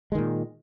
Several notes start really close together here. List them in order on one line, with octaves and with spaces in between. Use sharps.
G#3 D#3 A#2